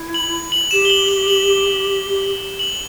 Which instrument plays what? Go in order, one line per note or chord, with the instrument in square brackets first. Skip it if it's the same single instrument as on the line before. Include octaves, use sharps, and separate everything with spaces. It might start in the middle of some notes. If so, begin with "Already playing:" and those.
Already playing: [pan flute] E4
[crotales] F#7
F#7
[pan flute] G4 [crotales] E7
[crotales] G7
F#7
G7
F#7
F#7